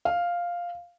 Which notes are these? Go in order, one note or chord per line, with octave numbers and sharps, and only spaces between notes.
F5